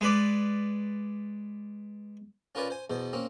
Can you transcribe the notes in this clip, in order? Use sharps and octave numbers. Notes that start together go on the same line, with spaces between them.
G#3 B4 D5
C#4 F4 A#4 B4 D5 G#5
C5 G#5
E2 B2 C5
A#3 C4 C#4